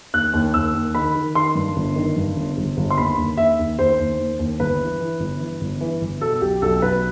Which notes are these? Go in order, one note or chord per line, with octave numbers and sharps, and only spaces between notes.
D#2 F#6
D#2
D#2 E6
D#2
D#3 B5
D#3
D#3 C6
G2
G1
D#3
G2
G1
G1
G1
C6
D#2 B5
D#2
D#2 E5
D#2
D#2 C5
D#2
D#2
D#2
G1 B4
E3
E3
G1
E3
G1
E3
G1
B2 A4
B1 G4
B1 A4
B1 B4